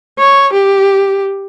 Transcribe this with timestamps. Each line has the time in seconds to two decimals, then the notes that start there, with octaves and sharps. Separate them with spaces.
0.19 C#5
0.53 G4